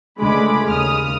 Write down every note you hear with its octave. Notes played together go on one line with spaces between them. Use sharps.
C#2 D3 G#3 A3 B5 D6
D#2 C#3 D#6 F6